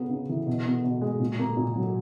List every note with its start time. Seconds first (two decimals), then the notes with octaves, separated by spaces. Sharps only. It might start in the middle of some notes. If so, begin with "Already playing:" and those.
Already playing: C#3 B3
0.10 C#3
0.29 E3
0.47 B2
0.66 B3
0.84 B2
1.01 G#3
1.20 A#2
1.39 A#3
1.57 A#2
1.76 F#3